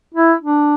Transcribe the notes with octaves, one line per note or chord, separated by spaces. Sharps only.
E4
D4